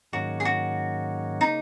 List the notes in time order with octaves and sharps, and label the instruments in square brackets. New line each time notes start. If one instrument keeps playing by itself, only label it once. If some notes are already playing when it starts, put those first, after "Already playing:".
[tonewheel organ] G#2 D#3 F#3 A#3 C#4 [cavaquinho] F#4
[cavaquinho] G#4
F#4
[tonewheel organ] C#3 A#3 [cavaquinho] D#4